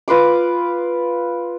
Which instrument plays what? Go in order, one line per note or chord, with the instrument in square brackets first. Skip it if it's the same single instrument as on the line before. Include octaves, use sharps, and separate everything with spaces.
[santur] F4 B4 C6 D6